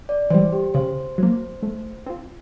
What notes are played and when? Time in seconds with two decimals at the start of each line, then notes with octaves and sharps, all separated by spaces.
0.09 D5
0.30 E3 G3 C5
0.52 G4
0.74 C#3 C5
1.18 F#3 A#3
1.63 A3
2.06 C4 F4